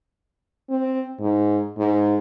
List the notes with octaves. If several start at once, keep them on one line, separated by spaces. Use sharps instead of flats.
C4
G#2
G#2